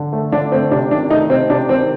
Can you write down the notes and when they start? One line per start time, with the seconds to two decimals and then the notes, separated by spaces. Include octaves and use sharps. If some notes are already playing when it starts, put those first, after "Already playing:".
Already playing: D3
0.13 A3
0.32 D3 D4
0.52 A3 C4
0.71 C3 D4
0.91 D#3 D4
1.10 A3 D#4
1.30 C3 C4
1.49 C3 D4
1.69 D#3 C4